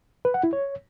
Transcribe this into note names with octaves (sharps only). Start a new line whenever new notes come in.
B4
F#5
E4
C#5